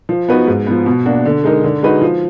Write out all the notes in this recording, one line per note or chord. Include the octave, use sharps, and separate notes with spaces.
F3
B3 D#4 F#4 B4
G#2
F3 B3
B2
A#3 D4 F#4
D3
G#3 D#4 A#4
D3
G#3 D#4 F#4 B4
F3